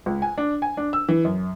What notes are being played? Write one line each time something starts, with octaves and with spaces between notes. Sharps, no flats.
C#2
G#5
D4
G#5
D4
E6
E3
F#2